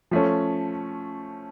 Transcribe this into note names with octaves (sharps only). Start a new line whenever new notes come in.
F3 A3 C#4